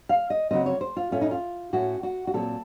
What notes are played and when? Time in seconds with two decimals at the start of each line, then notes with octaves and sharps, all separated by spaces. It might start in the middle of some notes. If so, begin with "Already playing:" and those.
0.09 F5
0.30 D#5
0.51 C#3 F#3 C4 D#5
0.66 C#5
0.81 C5
0.97 F4
1.11 A2 A3 C#4 F4
1.21 D#4
1.31 F4
1.73 A2 A3 C#4 F#4
2.03 F#4
2.27 F#4
2.34 A#2 F#3 C4 A4